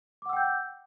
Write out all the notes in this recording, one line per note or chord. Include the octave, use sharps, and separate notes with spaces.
F#5 G5 D6 E6 G6